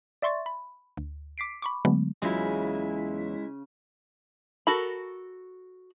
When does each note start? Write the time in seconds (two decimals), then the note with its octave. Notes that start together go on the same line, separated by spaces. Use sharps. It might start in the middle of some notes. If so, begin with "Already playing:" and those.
0.22 D5 E5 C6 C#6 A6
0.46 B5
0.97 D2
1.38 D6 B6 C7 D7
1.62 B5 C#6 D6
1.85 D3 F#3 G#3 A3 B3
2.22 E2 C#3 F#3 G#3 E4 F4 G#5
4.67 F#4 A4 A#4 B5